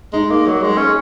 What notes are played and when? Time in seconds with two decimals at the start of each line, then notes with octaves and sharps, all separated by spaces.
0.13 G#3 D#4
0.30 A#3
0.46 F#3
0.62 G#3
0.77 C#4